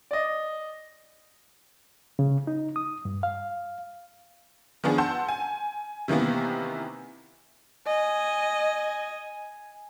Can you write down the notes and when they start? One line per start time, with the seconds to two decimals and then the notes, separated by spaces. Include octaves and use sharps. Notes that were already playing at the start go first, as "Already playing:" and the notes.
0.11 D5 D#5
2.19 C#3
2.47 D#4
2.76 D#6
3.05 G2
3.23 F5
4.84 D#3 F3 B3 D4 G#4
4.98 F#5 A5 C6 E6 G6
5.29 G#5
6.08 C3 D#3 E3 A#3 B3
7.87 D#5 G#5